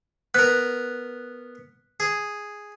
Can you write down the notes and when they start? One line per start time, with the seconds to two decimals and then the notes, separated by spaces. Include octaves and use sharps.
0.34 B3 A#4 F#6
2.00 G#4